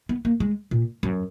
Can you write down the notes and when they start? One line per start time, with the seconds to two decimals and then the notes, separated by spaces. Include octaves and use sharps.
0.09 B3
0.25 A#3
0.40 G#3
0.71 A#2
1.03 F#2